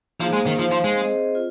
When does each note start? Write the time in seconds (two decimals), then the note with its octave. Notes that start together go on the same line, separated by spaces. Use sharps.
0.20 F3 A#3 D#4 G#4 C5 F5
0.33 G#3
0.46 D#3
0.59 F3 D#4 C5 F5
0.71 F3
0.84 G#3
0.97 C4 G#4 C5 D#5
1.35 F4